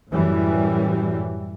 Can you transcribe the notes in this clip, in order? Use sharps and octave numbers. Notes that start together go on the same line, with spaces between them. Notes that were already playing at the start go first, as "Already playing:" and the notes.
F#2 A2 E3 G3